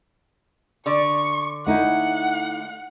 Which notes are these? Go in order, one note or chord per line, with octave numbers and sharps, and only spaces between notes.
D3 D5 C#6
A3 D#4 E4 F#5